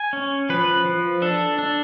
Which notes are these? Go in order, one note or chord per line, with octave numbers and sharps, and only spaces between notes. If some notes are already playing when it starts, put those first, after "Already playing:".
Already playing: G#5
C#4
F3 B4
F3
D4 A4
D4